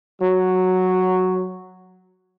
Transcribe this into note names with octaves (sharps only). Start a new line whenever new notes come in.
F#3